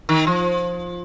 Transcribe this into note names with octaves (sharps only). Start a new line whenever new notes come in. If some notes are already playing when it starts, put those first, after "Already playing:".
D#3
F3